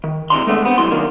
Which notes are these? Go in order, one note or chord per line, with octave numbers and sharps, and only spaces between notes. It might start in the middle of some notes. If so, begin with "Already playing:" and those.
D#3
C3 E3 G#3 D4 A#5 C6
G#3 A3 B3 D4
B3 C4
C2 G#2 F#3 G3 E4 C6
B1 D#3 A#3 D4 A#4